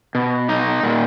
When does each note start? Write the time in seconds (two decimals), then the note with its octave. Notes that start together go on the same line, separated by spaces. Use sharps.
0.15 B2
0.49 D#4
0.84 A#2